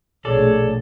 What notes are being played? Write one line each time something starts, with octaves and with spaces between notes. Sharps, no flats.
A#1 B2 A3 G#4 A4 C#5 D5